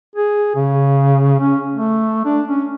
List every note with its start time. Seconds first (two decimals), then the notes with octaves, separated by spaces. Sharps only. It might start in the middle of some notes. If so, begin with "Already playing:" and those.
0.16 G#4
0.56 C#3
1.40 C#4
1.72 A3
2.25 D4
2.48 C#4